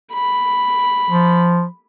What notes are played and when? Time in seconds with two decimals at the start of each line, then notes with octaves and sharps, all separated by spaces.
0.13 B5
1.10 F3